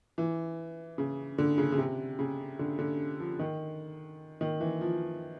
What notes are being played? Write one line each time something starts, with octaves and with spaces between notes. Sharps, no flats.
E3
C#3
D3
C#3
C#3
C3
C#3
D3
D3
F3
D#3
D#3
E3
F3